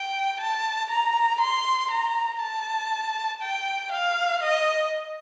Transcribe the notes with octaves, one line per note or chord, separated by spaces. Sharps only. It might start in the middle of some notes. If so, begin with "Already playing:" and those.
Already playing: G5
A5
A#5
C6
A#5
A5
G5
F5
D#5